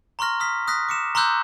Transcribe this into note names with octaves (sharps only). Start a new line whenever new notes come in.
A#5 C6 C#6 F6 A#6
D#6 F6 B6
D#6 F#6 A#6 B6
D6 C#7 E7
A#5 C6 D6 E6 F#6 G6